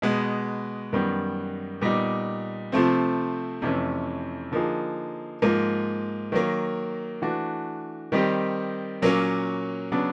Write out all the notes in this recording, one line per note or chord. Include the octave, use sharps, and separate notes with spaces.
B2 G#3 B3
F#2 D#3 G3 B3
A#2 G3 B3 D#4
C3 F3 A3 C4
F2 C3 E3 A3 C#4
D3 F3 A#3 D#4 G#4
G#2 F3 A#3
D#3 F#3 A#3
E3 A3 D4 F#4
D#3 G3 C4 D#4 G4
A#2 F#3 A#3 C#4
C#3 F#3 B3 D4